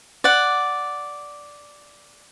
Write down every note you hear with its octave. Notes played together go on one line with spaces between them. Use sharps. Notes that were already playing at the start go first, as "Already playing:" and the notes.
D5 F#5